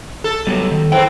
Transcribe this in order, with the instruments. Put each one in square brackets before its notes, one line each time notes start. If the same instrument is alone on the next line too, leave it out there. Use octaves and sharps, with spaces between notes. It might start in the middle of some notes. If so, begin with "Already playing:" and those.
[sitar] A4
[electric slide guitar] F#3 G3 B3
D#3
[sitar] E2 E3 C4 [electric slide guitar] G5